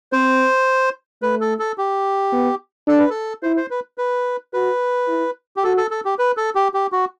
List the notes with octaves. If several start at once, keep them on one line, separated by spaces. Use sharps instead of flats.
C4 C5
A3 B4
A4
A4
G4
B3
D4 A4
B4
A4
E4 C5
C5
B4
B4
F#4 B4
E4
G4
F#4 A4
A4
A4
G4
B4
A4
G4
G4
F#4